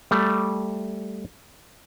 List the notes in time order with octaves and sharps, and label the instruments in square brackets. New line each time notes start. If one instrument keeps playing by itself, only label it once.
[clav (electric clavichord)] G3 A3